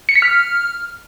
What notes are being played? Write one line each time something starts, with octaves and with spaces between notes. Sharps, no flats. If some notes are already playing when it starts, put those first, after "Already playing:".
C#7
B6
F6